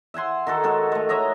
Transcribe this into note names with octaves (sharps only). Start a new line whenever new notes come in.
E5 F#5 G#5 C6
D#3 F#4 A4
G#3 F#4 A4 C#6
G#3 A3
C#5 D#5 E5 A#5